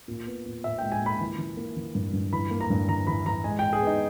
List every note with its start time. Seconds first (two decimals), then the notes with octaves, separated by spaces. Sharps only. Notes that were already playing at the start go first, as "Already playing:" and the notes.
0.08 A#2
0.26 B3
0.46 A#2
0.64 A#2 E5
0.78 G#3 G5
0.92 G#5
1.02 A#2 B5
1.21 E3
1.38 E3
1.57 A#3
1.76 E3
1.95 G2
2.13 G2
2.33 E3 B5
2.51 A#3
2.61 A#5
2.70 G2
2.88 E3 A#5
3.07 E3 B5
3.26 E3 A#5
3.44 G#3 G#5
3.59 G#3 G5
3.73 G#4
3.82 B3 D#4